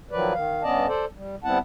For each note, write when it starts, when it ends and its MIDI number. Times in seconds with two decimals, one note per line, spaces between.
0.11 0.33 51
0.11 0.33 53
0.11 0.33 54
0.11 0.33 71
0.11 0.33 74
0.33 0.63 51
0.33 0.63 77
0.63 0.87 43
0.63 0.87 59
0.63 0.87 61
0.63 0.87 74
0.63 0.87 75
0.63 0.87 81
0.88 1.05 69
0.88 1.05 72
0.88 1.05 74
1.15 1.36 55
1.44 1.58 55
1.44 1.58 59
1.44 1.58 60
1.44 1.58 64
1.44 1.58 78
1.44 1.58 81